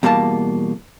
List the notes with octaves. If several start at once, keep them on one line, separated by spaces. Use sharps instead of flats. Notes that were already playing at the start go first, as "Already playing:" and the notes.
E2 B2 G3 A#3 A5